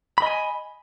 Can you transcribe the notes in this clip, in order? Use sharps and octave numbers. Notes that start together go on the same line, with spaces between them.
D#5 G#5 B5